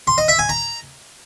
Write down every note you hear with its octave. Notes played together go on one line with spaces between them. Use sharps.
C6
D#5
E5
G#5
A#5